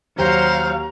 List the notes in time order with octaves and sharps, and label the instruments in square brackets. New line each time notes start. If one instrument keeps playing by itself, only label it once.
[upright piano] D#2 [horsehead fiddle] F#3 F5 [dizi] C5 [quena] A#5